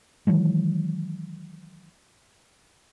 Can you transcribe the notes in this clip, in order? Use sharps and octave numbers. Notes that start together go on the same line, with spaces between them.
D#3 E3 F#3 G#3